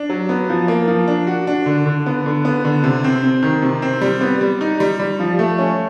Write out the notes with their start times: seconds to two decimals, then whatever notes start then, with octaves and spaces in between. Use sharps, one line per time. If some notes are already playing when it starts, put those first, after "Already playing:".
Already playing: D4
0.10 F#3
0.29 B3
0.49 F3
0.68 A#3
0.88 F3
1.07 D4
1.27 F#4
1.47 D4
1.66 D3
1.86 D3
2.06 B3
2.26 D3
2.45 B3
2.65 D3
2.84 C3
3.04 C4
3.23 C4
3.43 D#3
3.62 C3
3.82 C4
4.01 G3
4.21 B3
4.41 G3
4.61 D#4
4.80 G3
5.00 G3
5.19 F3
5.39 A3
5.59 C#4